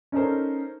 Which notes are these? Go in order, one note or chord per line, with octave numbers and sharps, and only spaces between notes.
C#4 D#4 A4 A#4 C5